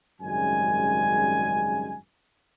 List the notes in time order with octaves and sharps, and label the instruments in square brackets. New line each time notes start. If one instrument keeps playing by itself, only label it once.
[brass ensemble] G#1 F#2 C#3 G3 G#3 G#5